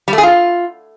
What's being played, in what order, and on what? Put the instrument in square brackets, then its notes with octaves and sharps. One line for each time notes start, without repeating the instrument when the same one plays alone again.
[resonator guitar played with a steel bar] G3
A3
G#4
F4